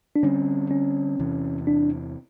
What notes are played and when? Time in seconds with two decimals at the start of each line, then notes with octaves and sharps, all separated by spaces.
0.16 D4
0.23 D3 G3 C4 C#4
0.71 C#4
1.19 E2 C3 E3
1.67 D4